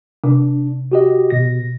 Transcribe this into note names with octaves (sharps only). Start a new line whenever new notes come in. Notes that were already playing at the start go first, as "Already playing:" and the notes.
C3 D4
F#4 G4 D#5
B2 A#6